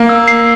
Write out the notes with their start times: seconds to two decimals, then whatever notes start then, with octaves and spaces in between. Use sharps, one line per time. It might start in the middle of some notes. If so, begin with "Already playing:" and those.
Already playing: A#3
0.09 E6
0.28 C7